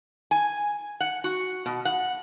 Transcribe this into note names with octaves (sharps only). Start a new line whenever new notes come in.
G#5
F#5
F#4
B2
F#5